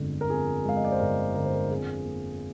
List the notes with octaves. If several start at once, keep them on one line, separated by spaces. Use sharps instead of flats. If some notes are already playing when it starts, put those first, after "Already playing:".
Already playing: G1 F2 D3 G#3
A#4
F2 G#4
G#3 F5
D#5
D5
C5
G1 A#4
D3 A#4
C5
A#4
F2 G#4
A#3